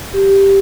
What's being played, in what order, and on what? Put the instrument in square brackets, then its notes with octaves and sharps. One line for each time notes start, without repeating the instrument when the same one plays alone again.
[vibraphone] G4